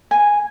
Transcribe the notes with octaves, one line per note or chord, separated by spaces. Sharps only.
G#5